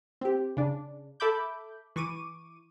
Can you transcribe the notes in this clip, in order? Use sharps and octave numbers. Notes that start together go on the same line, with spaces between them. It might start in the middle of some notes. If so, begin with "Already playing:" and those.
C4 G4
C#3 D4
A4 E5 B5 D6 G6
E3 C#6 D6 D#7